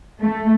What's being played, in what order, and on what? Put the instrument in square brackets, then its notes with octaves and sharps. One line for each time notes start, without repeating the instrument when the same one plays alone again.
[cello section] A3